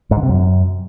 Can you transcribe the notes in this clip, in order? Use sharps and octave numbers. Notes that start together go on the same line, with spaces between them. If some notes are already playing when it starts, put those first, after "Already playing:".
G#2
D3
C3
F#2